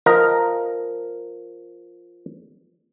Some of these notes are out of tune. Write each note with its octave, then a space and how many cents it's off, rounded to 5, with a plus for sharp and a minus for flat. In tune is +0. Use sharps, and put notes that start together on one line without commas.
F3 +0 A#4 +0 D#5 +0